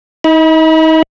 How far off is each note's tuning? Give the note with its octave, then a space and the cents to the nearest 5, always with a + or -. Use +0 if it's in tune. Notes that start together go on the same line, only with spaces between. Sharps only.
D#4 +35 B5 -30